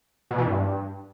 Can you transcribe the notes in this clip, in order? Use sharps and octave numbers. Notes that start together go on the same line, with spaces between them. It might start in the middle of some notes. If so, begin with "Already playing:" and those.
B2
E3
G2